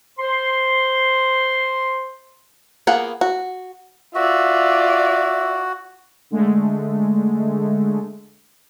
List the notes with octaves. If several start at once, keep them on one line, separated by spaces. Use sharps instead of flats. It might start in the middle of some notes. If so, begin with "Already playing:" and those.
C5 C6
A#3 B3 F4 G#4 F#5
F#4
F4 F#4 D5 E5
D3 G#3 A3